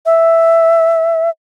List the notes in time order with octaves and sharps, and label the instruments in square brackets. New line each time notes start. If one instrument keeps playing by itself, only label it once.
[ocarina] E5